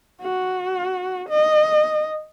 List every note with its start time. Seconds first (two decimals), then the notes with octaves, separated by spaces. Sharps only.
0.22 F#4
1.30 D#5